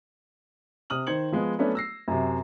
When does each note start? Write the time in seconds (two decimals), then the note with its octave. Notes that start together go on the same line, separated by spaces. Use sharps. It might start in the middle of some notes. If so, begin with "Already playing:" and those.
0.90 C3 D#6 F6 F#7
1.07 D#3 C5 G#6 C#7 F#7
1.32 F3 G#3 B3
1.59 F#3 A3 B3 C#4 D4 F#4
1.75 E6 A#6 C7
2.08 F#2 C3